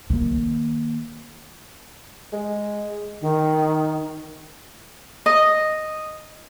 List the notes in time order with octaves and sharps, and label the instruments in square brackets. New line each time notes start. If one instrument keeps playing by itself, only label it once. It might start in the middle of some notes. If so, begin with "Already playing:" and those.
[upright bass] D#3 A#3
[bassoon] G#3
[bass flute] D#3
[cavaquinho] D#5